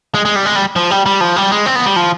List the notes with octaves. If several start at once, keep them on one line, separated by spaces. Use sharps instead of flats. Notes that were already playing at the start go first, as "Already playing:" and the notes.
G#3
G#3
G3
G#3
G3
F3
G3
G3
F3
G3
G#3
C4
B3
G3
F3